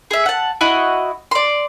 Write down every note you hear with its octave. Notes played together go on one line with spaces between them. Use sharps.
G#4 E5
F#5 A5
E4 F#4 D#5 F#5
D5 C6